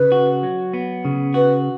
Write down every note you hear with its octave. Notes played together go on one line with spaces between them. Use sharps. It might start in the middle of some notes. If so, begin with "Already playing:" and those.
Already playing: C#3 B4
F#4
F#3
B3
C#3
F#4 B4